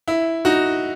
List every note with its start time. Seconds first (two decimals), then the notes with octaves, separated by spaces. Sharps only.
0.08 E4
0.45 D#4 F#4